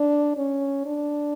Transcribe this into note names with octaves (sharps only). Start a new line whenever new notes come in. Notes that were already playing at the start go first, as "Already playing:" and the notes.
Already playing: D4
C#4
D4